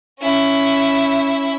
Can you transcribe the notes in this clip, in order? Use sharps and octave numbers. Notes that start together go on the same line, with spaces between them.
C#4 E4